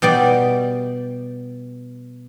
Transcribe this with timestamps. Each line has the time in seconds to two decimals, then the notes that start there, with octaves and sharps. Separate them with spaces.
0.02 B2 G3 G4 D5